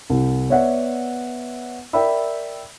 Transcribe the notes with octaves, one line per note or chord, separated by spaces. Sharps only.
C2
B3 C#5 D5 E5 F#5
A#4 D5 E5 G5 B5 E6